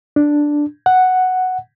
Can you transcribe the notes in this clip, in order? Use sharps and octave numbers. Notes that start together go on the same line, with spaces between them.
D4
F#5